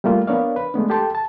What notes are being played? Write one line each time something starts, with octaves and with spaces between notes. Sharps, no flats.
G3 A3 A#3 F4
B3 D4 A#4 C#5 D5 F5
B4
G#3 A3 B3 D4
G4 A4 G5 A5 C6
A5